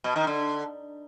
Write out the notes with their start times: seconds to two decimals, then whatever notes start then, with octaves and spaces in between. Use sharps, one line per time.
0.04 B2
0.16 D#3
0.27 D3